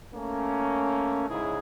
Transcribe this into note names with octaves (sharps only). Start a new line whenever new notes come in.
A3 A#3 C#4
G#2 C#3 G#3 E4 G#4